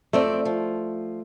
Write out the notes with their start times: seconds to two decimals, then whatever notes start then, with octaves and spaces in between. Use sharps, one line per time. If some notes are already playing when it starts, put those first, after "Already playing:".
0.13 F2 A3 C4 D5
0.45 F3